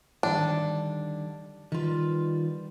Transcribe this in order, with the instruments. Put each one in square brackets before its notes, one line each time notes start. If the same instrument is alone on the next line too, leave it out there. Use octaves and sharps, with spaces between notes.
[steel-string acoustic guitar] D3 D#3 G3 [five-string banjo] D4
[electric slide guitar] D#3 F4 [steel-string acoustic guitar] G3 B4